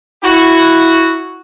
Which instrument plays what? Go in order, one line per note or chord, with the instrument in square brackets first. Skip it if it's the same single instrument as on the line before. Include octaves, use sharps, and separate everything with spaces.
[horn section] E4 F#4